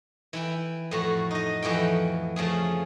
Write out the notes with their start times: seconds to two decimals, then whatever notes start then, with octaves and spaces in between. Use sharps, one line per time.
0.33 E3 E4 G5
0.91 F2 A2 F#4
1.31 D#4 D#5
1.62 F2 E3 F#4 G5
2.36 C#3 F3 A3 G#4